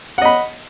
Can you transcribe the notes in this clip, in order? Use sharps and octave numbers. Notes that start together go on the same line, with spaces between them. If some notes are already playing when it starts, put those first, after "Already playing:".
D#5 F#5 B5